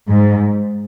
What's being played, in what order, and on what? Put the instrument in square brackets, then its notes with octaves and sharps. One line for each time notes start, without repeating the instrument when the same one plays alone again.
[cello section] G#2